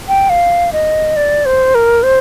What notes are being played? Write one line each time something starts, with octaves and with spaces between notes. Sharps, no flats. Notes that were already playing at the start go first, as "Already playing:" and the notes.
G5
F5
D#5
D5
C5
A#4
C5